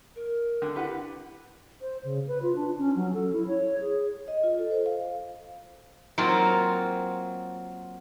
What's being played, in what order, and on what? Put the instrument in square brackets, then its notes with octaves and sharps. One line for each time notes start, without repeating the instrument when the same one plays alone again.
[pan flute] A#4
[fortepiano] D3
[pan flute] E4 [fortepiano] G4 B4 F#5
[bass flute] C5
C#3
B4
F4
D4
C#4
F#3
A4
E4
C#5
G#4
[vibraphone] D#5
F4
A4
C5
F5
[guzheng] F#3 A#3 C4 F4